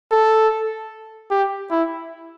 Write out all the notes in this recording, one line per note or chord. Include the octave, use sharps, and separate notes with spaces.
A4
G4
E4